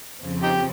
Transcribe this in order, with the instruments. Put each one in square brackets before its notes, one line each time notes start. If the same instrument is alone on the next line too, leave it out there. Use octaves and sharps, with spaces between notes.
[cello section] F2 C#3 F3 C4
[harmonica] D#4 G4